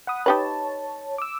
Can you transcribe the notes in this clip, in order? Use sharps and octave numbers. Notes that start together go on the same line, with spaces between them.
F#5 B5 D#6
D#4 G4 B4 C#5 A5
D6 E6